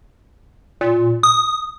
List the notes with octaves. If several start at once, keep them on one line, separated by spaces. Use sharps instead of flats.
A#2
D#6